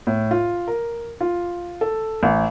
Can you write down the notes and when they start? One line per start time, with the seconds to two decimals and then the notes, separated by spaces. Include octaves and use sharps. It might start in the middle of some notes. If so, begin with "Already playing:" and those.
0.07 A2
0.31 F4
0.68 A#4
1.20 F4
1.81 A4
2.23 A1